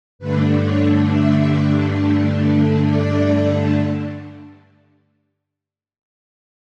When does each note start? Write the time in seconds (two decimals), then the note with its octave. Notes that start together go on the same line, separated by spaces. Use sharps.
0.19 G2 D3 A3 D4 B4
0.63 C#5
1.09 E5
2.89 D5